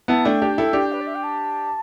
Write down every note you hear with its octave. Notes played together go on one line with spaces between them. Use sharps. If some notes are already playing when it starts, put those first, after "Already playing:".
B3 E4 A5
A3 D4 G5
D4 G4
E4 A4
D4 G4
B4
D5
E5
G5
A5